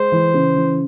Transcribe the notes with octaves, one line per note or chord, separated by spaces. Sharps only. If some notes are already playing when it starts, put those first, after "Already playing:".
Already playing: G#3 C5
E3
C#3
E3